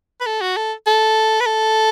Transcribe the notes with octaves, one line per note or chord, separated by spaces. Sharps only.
B4
A4
F#4
A4
A4
B4
A4